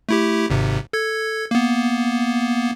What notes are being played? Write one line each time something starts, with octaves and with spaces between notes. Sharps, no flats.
A3 E4 G4
G#1 G#2 C3
A4 G#6
A#3 B3